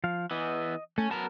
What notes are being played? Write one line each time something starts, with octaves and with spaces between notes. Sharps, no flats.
F3 F5
E3 B3 D#5
A3 C#4
F#3 B3 A#4 A5